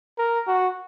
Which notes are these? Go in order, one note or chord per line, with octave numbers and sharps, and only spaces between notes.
A#4
F#4